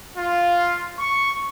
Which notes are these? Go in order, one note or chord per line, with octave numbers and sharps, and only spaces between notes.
F4
C#6